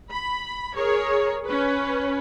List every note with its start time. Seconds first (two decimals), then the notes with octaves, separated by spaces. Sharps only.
0.12 B5
0.75 G#4 A#4 C#5
1.46 C#4 B4